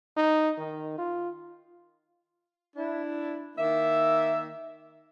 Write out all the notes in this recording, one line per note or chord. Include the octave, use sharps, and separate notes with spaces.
D#4
D#3
F4
D4 E4
D#3 A#3 E5